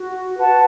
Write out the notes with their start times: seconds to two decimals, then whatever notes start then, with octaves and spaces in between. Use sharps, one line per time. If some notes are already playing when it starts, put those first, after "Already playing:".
Already playing: F#4
0.37 B4 F#5 A5